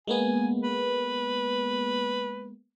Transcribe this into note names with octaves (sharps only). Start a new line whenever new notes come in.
G#3 A#3 B3 G#5
B4